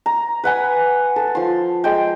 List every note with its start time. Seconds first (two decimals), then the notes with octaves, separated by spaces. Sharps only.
0.06 A#5
0.44 B4 F#5 G#5 B5
1.16 A4
1.35 F3 C6
1.84 G#3 G5